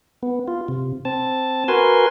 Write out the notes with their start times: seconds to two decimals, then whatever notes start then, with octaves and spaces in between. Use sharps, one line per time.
0.23 B3
0.48 F4
0.68 C3
1.05 C4 A5
1.68 F#4 A#4 B4 G#5 C6